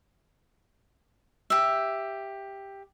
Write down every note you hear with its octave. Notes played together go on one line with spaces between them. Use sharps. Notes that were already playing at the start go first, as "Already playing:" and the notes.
G4 E5